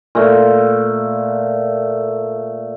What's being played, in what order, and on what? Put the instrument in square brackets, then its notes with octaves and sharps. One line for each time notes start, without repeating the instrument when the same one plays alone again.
[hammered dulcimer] A#2 A3